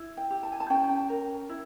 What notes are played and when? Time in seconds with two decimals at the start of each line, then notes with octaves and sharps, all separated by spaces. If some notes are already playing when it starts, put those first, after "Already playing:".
Already playing: E4
0.17 G5
0.31 G4
0.43 A5
0.52 G#5
0.60 A5
0.70 C#4 G5
1.09 A#4
1.49 E4